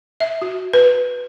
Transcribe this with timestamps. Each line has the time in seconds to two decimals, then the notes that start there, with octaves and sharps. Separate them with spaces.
0.20 E5
0.42 F#4
0.73 B4